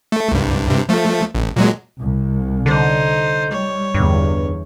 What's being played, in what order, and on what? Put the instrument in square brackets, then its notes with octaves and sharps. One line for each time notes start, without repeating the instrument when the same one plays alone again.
[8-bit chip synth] A3
C2 G2
G2 C3
F3 A3
A1
A#2 F#3 G#3
[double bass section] C2
[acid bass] D3 [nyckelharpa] D#4 C5
[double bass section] G3 [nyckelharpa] C#5
[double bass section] G1 E2 [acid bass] G2